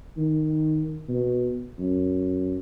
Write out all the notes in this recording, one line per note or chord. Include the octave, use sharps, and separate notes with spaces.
D#3
B2
F#2